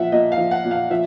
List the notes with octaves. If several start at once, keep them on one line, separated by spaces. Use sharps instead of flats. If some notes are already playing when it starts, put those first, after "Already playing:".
Already playing: A#2 F3 E5 F#5
A#2 D#5
F5
F3
F#5
A#2
F5
F3 E5